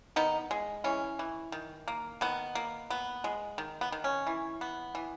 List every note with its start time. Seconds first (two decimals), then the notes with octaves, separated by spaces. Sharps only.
0.16 D#3 B3 D#4
0.51 G#3
0.84 E3 C#4
1.19 E3
1.52 D#3
1.88 A#3
2.21 D#3 B3
2.55 A#3
2.90 B3
3.24 G#3
3.58 D#3
3.81 B3
3.92 D#3
4.04 C#4
4.27 E3
4.61 B3
4.95 E3